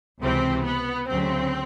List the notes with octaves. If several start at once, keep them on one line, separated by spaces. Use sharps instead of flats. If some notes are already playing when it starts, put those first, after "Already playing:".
C#2 C3 E3 C4
B3
D2 C#3 F#3 C4